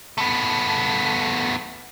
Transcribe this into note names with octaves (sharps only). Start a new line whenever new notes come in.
A3 B3